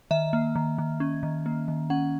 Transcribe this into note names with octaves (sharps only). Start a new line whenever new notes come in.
D#3 E5
A#3
D#3
D#3
C#4
D#3
A#3
D#3
C#4 F#5